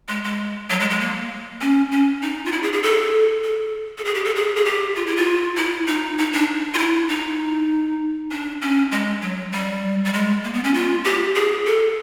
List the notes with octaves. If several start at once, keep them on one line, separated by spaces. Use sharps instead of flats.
G#3
G#3
F#3
G#3
G#3
A#3
C#4
C#4
D#4
F4
E4
G#4
G#4
A4
A4
A4
G#4
G4
A4
G#4
G#4
G4
F4
E4
F4
E4
D#4
D#4
D4
F4
E4
D#4
D4
C#4
G#3
F#3
G3
G3
G#3
A#3
B3
C#4
F4
G4
G#4
A4